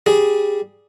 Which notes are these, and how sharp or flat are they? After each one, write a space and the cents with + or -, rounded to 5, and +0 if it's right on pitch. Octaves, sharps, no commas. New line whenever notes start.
G3 +0 G#4 +0